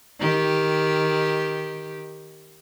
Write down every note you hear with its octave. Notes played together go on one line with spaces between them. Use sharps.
D#3 G4